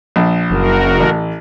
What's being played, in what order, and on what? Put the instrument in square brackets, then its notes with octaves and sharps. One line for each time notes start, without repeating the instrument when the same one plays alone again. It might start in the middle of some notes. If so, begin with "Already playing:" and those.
[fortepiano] A#1
[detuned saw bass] F#1 [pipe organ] F#4 A#4
[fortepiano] A1